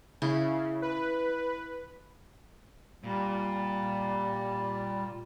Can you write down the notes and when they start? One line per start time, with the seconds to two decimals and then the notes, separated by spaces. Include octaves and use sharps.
0.22 C#3 E4
0.82 B4
3.04 A#2 G3